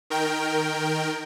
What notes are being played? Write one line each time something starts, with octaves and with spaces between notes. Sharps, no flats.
D#3 A#4 G5